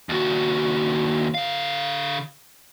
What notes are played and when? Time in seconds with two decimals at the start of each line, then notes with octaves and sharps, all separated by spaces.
0.09 D#2 F#4
1.34 D3 F5